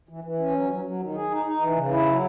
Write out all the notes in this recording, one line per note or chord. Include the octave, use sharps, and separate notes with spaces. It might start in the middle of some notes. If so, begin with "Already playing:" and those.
E3
E3
C#4
F#3
F#3
F#3
D#3
G#4
D#4
D#4
E3
C#3
E4
F#3